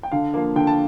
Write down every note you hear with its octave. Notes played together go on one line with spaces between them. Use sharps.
G5
D3 F5
F3 A#3
D3 G5
A5